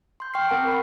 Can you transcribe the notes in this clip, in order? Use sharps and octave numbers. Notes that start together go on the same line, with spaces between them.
C6 G6
G5 C6 C#6 F6 G6 C7
C4 A#4 F#5 A5 D7
B5 C#6